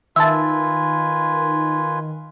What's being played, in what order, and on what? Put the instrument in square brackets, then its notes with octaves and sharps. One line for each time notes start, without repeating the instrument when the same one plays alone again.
[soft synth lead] D#3 [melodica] F4 B4 G#5 [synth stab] E5 A5